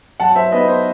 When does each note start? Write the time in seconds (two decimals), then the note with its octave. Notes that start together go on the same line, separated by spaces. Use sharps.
0.20 F#3 F#5 A5
0.36 C5 E5
0.52 B3 D#4 B4 D#5
0.68 C5